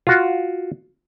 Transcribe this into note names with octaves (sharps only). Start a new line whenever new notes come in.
F4 F#4